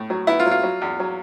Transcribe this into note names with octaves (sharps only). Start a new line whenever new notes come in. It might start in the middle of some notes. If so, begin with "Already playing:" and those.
Already playing: A2
F#3
B3 E4
F4
F#3
F4
F#3
E2
F#3